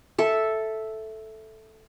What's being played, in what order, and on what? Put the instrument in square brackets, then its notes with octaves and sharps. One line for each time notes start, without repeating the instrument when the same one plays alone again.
[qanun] A4 E5